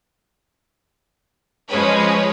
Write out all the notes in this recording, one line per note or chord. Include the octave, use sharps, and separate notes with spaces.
F3 G#3 C#4 G#4 B4 C#5